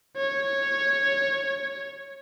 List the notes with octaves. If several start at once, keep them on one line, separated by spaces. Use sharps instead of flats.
C#5